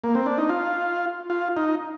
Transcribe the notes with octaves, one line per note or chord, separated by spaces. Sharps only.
A#3
C4
D4
D#4
F4
F4
D#4